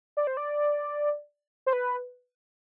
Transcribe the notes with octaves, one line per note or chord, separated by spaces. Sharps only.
D5
C5
D5
C5
B4